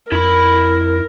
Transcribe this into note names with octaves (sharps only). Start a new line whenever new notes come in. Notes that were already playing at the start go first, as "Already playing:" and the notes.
F2 E4 A#4 B5